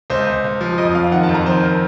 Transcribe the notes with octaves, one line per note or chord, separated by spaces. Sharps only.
C#2 C5
C#2
C#2
F3
F2 D#5
F2 F5
D#3 F#5
A5
F2
A#5
D#3 C5
A#4